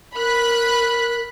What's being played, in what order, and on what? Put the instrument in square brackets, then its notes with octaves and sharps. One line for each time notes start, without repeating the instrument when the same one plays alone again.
[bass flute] A#4 [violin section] B5 F#6